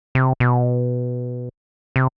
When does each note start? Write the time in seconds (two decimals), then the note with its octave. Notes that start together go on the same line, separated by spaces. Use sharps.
0.15 C3
0.40 B2
1.96 C3